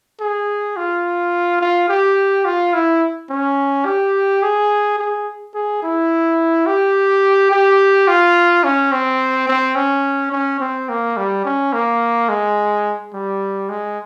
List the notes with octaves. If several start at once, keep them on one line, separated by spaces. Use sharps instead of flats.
G#4
F4
F4
G4
F4
E4
C#4
G4
G#4
G#4
G#4
E4
G4
G4
F4
C#4
C4
C4
C#4
C#4
C4
A#3
G3
C#4
A#3
G#3
G3
G#3